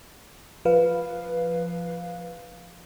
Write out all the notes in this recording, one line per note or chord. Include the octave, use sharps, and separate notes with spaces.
F3 B4 F5